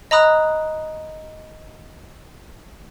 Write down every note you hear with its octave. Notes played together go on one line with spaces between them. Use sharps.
D#5 A#5 B5 D#6 F#6